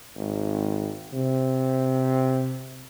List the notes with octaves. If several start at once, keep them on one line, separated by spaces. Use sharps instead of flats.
G#1
C3